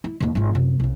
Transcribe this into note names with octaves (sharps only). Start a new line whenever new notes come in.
E4
D#2 D3
G#1 F4
F#2 C3
C2 C#3